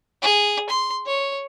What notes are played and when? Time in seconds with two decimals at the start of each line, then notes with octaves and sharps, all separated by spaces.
0.22 G#4
0.70 C6
1.06 C#5